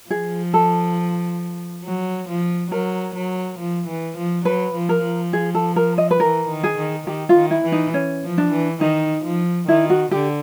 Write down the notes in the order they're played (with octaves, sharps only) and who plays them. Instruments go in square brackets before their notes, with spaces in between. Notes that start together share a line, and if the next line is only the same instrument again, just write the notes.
[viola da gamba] F3 [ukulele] G#4
[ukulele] A4
[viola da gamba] F#3
F3
[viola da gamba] F#3 [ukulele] A#4
[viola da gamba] F#3
F3
E3
F3
[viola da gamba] F#3 [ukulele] B4
[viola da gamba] F3
[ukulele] A#4
[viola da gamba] F3
[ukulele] G#4
A4
A#4
D#5
B4
[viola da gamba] E3 [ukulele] A#4
[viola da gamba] D#3
[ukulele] G#4
[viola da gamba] D#3
[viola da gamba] D#3 [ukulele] G4
[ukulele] F4
[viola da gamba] D#3
[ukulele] E4
[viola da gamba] E3
[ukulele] D#4
C#4
[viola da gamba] F3
[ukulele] D4
[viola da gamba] E3
[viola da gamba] D#3 [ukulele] D#4
[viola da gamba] F3
[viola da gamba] D#3 [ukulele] E4
[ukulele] F#4
[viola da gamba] D3 [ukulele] G4